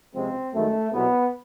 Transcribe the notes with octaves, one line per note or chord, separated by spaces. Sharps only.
C#2 C3 F3 G#3 C4
F#2 D#3 G#3 A3
C2 B2 F#3 B3